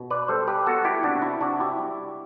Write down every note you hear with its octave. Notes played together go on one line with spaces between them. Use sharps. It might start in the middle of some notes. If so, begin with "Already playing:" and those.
Already playing: B2
B4 D5
G3 A4 C5
G4 B4
B3 F#4 A4
E4 G4
C3 D4 F#4
E4
C3 D4 F#4
E4 G4
G3